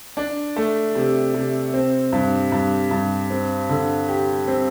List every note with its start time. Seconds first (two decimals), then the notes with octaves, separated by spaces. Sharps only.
0.17 D4
0.56 A3
0.95 C3
1.35 C3
1.74 C4
2.12 G2
2.52 G2
2.91 G2
3.30 C4
3.69 D3
4.08 G4
4.48 C4